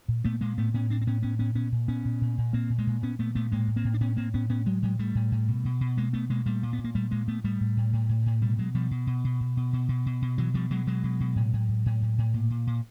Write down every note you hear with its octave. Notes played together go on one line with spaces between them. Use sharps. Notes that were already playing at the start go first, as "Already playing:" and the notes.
A#2
A#2 A3 B3
A#2 G#3 A#3
A2 A3 B3
A2 B3 C#4
A2 C4 D4
C4
A2 B3 C#4
A2 B3 C#4
A2 B3 C#4
A#2 B3 C#4
A#2
A#2 B3 C#4
A#2
A#2
A#2
A#2 A#3 C4
A#2
G#3 A#3
A#2
A#2 B3 C#4
A#2 A3 B3
A#2 A3 B3
A2 G#3 A#3
A2
A#3 C4
A2
D4
A2 B3 C#4
A2 A#3 C4
A2 B3 C#4
A2 B3 C#4
A2 F#3 G#3
A2 F#3 G#3
A2 G3 A3
A2
A2
B2
B2
B2
B2 G#3 A#3
B2 A3 B3
B2 G#3 A#3
A#2 G3 A3
A#2
B3
A#2
A#3
A#2 G3 A3
A#2 G#3 A#3
A#2 A3 B3
A2 G3 A3
A2
A2
A2
A2
A2
B2 G3 A3
B2 F#3 G#3
B2 F3 G3
B2
B2
B2
B2
B2
B2
B2
B2
B2
B2 E3 F#3
B2 F3 G3
B2 F#3 G#3
B2 F#3 G#3
B2
B2
A2
A2
A2
A2
A2
A2
A#2
A#2
A#2